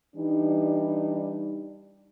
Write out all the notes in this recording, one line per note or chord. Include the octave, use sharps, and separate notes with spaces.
E3 G3 D4 D#4